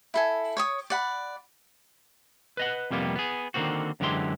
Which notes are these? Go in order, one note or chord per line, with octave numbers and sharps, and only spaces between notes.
E4 A4 G#5
C#5 C#6 D#6
D5 F#5 B5
B4 D#5 F#5
F2 C3 G3 A#3 B3
B3 G#4
D3 D#3 F3 A#3 C4 F#4
F#2 D3 E3 G#3 G4 C6